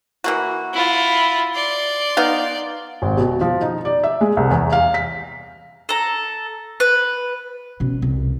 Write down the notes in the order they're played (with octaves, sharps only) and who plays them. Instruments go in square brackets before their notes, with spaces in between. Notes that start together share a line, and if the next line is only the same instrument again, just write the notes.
[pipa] E3 A#3 F#4
[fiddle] E4 F4
D5 C6
[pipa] B3 D#4 F5
[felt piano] G#1
B2
F3
D#4
D5
E5
G#3
C2
E2
F5
B6
[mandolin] A4 A#5
B4
[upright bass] B2 C#4
C2